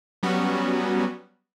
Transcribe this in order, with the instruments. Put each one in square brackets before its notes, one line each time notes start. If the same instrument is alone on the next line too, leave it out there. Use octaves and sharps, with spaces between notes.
[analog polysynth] F#3 G3 B3 C#4 F#4